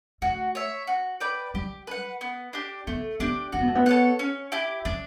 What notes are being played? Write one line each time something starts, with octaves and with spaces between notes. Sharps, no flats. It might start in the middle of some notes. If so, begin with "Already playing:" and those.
A3 F#4
C#5 E5
F#4
B4 D5 G5
G3 G4
B4 F#5
B3
D4 G4
A3 B3
B3 D4 G4
C#4 F#4
B3
A3
B3
A4 C#5 F#5
C#4
E4 G4
C#4 D4